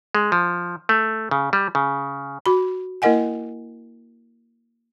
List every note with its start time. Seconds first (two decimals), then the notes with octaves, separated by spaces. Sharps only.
0.15 G#3
0.32 F3
0.89 A3
1.31 C#3
1.53 G3
1.75 C#3
2.46 F#4 B5
3.02 A#3 E4 A#4 D#5 F#5 G#5